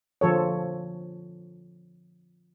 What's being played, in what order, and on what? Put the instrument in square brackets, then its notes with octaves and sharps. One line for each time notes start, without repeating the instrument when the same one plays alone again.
[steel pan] D3 F3 A4 C#5